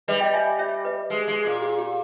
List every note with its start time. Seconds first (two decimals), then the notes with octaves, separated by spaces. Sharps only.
0.08 G3 B4 D#5
0.20 D#5 G5
0.34 E5 G#5
0.59 C#5 E5
0.85 B4 D#5
1.10 G#3 B4
1.28 G#3 G#4
1.44 A#2 G#4
1.56 G#4
1.62 G4
1.78 G4